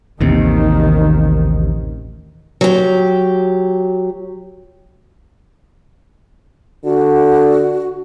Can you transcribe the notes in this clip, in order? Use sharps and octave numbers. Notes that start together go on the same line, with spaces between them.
A1 D#2 C3 D#3
F#3 G4
D3 F#4